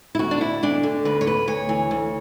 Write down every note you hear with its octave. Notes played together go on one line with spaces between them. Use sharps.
E4
D2 F#4
D4
D2 E4
D2 D4
D3
D2 B4
C#5
D2 B4
D2 C#5
E3
D2